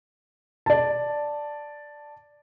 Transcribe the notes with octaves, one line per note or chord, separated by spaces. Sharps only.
D5 A5